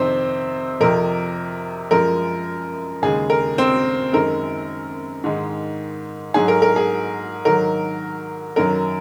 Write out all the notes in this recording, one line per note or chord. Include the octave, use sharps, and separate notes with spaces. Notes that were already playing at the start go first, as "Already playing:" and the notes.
Already playing: F2 C3 D#3 C4 C5
F2 C3 F3 A#4
F#2 F3 G#3 A#4
D#2 C#3 G#3 G#4
A#4
C4 C5
F#2 D#3 G#3 A#4
G#2 D#3 G#3
G#2 F#3 G#4
A#4
A#4
G#4
G#2 D#3 F#3 A#4
F#2 D#3 F#3 A#4